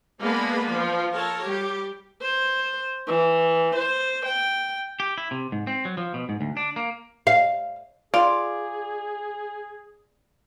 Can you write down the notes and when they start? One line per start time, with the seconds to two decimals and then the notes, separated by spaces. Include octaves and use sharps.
0.22 G#3 A#3 B3 D4 B4 B5
0.72 F3
1.13 A4 A#4 C#5
1.45 G3 G4
2.22 C5
3.07 E3
3.75 C5
4.26 G5
5.00 G4
5.18 E4
5.31 C3
5.52 G#2
5.67 C4
5.85 F#3
5.97 F3
6.14 B2
6.29 G#2
6.41 D2
6.57 D4
6.76 A#3
7.27 F5
8.14 F4 G#4 D5